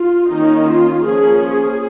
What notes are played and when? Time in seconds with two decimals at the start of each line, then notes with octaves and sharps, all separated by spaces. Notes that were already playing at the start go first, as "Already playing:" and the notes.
Already playing: F4
0.29 D#3 A#3 C#4 D#4
0.67 F4
1.03 F3 A#3 C#4 G#4
1.41 G#4